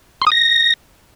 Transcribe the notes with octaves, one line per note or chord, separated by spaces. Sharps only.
C6
D#6
A#6